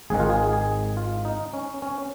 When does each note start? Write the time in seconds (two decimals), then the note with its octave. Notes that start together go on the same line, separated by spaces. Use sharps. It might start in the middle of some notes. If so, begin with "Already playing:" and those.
0.10 G#1 G#2 D#3 G#4
0.20 F4
0.30 G#4
0.53 G#4
0.97 F4
1.25 D#4
1.54 C#4
1.82 C#4